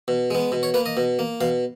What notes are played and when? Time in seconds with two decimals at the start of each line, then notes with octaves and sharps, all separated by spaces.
0.08 B2
0.31 G#3 B3
0.52 B2
0.63 C#5
0.74 A#3 B4
0.86 D#5
0.97 B2
1.19 A#3
1.41 B2 F5